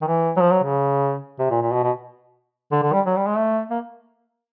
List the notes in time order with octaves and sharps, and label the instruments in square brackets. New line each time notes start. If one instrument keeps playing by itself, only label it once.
[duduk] D#3
E3
F#3
F3
F#3
C#3
C3
A#2
A#2
B2
B2
D3
D3
G3
F#3
G3
G#3
A3
A#3